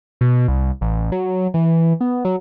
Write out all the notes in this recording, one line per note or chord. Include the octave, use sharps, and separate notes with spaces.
B2
C2
A1
F#3
E3
B3
F#3